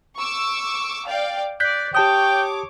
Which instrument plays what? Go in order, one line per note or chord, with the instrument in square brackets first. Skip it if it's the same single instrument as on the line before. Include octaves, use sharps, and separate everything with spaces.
[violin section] C#6 D6 E6
D5 F5 G5
[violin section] D5 [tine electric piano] F#6 G6 B6
[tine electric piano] G4 A5 D#6 [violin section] C#5 D6 [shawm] G5